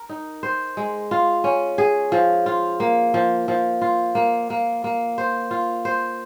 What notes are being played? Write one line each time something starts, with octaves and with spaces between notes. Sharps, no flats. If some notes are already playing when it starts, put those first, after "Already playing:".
Already playing: A#4
D#4
C5
G#3
F4
C#4
G#4
F3
F4
A#3
F3
F3
F4
A#3
A#3
A#3
C5
F4
C5